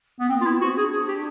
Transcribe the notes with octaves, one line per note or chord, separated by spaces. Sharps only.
B3
A#3 C4
F4
B3 E4
C4 F#4
D4 G#4
G#4
G4